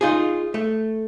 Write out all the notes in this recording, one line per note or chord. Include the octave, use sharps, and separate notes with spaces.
D#4 F4 G#4
A3